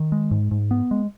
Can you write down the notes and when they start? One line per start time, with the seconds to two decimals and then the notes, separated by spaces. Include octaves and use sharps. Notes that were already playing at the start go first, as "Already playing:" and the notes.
Already playing: D#3
0.12 G#3
0.31 G#2
0.51 G#2
0.71 B3
0.91 G#3